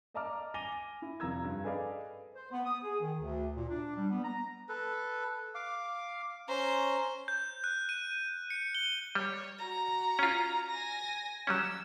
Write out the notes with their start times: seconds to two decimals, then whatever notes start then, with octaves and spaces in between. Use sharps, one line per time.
0.14 D5 D#5 A5 A#5 D6 F6
0.54 G#5 D6 A#6 D#7 F7 G7
1.02 E4
1.20 F1 F2 F4 A#5 E6 G#6
1.44 G2
1.64 G#4 A4 B4 D5 D#5 F5
2.34 C5
2.52 B3
2.65 D#6
2.83 G#4
3.01 D#3
3.20 D2
3.57 A#2
3.70 D4
3.96 G3
4.11 B3
4.24 A#5
4.69 A4 B4
5.55 F5 D6
6.48 C#4 C5 A#5
7.28 G6
7.64 F#6
7.89 D#7
8.50 C#7
8.75 G7
9.15 G3 C#5
9.58 F#4 A#5
10.19 C#4 F4
10.70 G#5 A#6
11.47 F#3 G3 C#4 E6